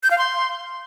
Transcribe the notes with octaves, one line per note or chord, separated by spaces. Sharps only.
G6
F5
C6